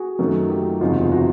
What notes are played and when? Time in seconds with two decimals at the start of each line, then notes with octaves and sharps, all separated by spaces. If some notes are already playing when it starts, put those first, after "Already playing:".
Already playing: F#4 G#4
0.19 F#2 D#3 F#3 A3
0.50 F4 G4
0.81 F#1 E2 C3 F3 G#3 D#4 F4
1.12 E4 F#4